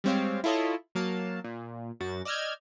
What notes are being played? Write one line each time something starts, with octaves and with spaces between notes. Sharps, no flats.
G3 G#3 C4 C#5 F5
E4 F4 A4 C#5 D#5
F#3 A#3 F5 A5
A#2
F#2 F#4 A6
D5 D#5 E6 F6 G6 G#6